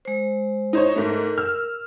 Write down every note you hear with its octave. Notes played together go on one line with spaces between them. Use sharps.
G#3 C5
D#4 C5 C#5
G#2 A3 A#4
E6 F6